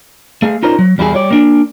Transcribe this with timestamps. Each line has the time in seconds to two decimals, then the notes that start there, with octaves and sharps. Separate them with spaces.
0.42 A3 G#4 F5
0.63 C#4 D#4 F4 A#4 C5 D5
0.79 F#3
0.98 E2 G3 E4 F#4 G#4
1.13 G3 C#5 D5
1.31 A#3 D4